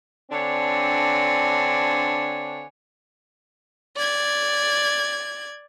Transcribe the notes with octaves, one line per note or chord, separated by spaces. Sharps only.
D3 C4 D4 C#5 G#5
D5 G#6